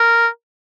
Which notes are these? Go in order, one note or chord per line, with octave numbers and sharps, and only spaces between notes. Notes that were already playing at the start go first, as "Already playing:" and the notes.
Already playing: A#4